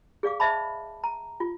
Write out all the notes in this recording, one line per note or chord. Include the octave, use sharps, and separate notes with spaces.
G#4 D5 F5 D6
C5 D#5 E5 A5 B5
A#5
F4